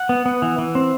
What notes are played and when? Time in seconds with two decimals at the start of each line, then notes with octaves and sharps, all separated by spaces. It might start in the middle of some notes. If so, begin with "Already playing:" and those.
Already playing: F#5
0.09 B3
0.26 B3
0.42 E3
0.58 E3
0.75 C4